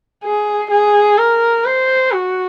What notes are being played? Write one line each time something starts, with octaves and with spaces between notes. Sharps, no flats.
G#4
G#4
A#4
C5
F#4